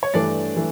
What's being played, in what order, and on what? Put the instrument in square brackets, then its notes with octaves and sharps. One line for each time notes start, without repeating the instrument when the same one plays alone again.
[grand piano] C#5
[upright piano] G2 E3 A3 [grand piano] D4 D5
[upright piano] E3 A3